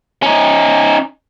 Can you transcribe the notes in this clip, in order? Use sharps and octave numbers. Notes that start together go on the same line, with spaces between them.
C#4 D#4